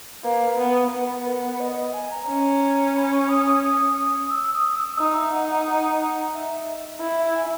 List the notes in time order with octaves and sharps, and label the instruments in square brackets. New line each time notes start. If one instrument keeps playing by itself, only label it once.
[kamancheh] A#3 [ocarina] B4
[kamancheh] B3
[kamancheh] B3 [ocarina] B4
[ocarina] B4
A#4
B4
D#5
D#5
G#5
A#5
[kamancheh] C#4
[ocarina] B5
C#6
D#6
D#6
D#6
D#6
E6
D#6
E6
[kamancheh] D#4 [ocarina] D#6
[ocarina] E5
F#5
F#5
F#5
E5
[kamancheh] E4 [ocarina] E5
[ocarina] E5
G#5